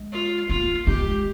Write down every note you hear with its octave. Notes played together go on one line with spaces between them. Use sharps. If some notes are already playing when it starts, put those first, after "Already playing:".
Already playing: G#3
F4
A#3 F4
G#3 G4